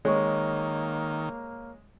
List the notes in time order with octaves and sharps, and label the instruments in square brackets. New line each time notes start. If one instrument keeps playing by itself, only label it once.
[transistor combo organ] D#3 [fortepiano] G#3 [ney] A#3 [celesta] C#5 C#6